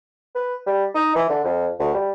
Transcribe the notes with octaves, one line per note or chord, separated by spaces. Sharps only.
B4
G3
D#4
E3
D3
F2
D2
G3